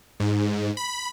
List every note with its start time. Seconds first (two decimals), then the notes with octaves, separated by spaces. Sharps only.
0.20 G#2
0.77 B5